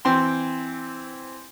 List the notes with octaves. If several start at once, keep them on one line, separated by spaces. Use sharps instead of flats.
E3 C4 G5 C6